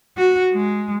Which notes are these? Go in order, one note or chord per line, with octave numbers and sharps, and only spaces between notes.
F#4
G#3